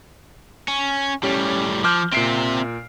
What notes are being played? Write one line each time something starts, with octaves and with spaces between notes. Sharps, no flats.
C#4
A2 G3 C#4 G4
F3 D6 F6 G6
A#2 C4 E5 C7 D7